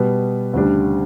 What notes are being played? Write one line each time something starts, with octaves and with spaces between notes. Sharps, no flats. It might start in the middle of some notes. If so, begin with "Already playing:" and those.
Already playing: B2 G3 B3
D2 C#3 G3 D4